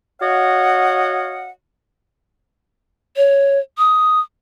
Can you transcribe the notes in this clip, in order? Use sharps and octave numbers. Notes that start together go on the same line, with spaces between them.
F#4 C#5 D#5 F5 F#5
C#5
D#6